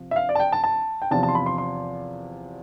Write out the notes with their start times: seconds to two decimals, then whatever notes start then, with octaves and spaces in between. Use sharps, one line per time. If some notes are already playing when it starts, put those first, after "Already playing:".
Already playing: C3 F3
0.11 E5
0.16 F5
0.29 D5
0.35 A5
0.40 G5
0.52 A5
0.64 A5
1.02 G5
1.11 E2 C3 F3 A5
1.23 A5
1.28 C6
1.35 B5
1.46 C6
1.58 C6